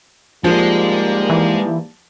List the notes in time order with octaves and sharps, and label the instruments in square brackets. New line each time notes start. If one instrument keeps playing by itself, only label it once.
[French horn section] G#2 G3 A#3 [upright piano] F3 [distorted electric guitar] G#3
[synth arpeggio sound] E3